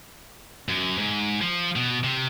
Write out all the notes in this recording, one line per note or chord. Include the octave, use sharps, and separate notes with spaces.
F#2
G#2
F3
B2
C3